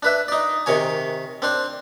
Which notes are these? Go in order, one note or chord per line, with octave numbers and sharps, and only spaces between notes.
D4 B4 E5
D#4 D5
C3 D#3 C#5 G#5
C4 D4 C5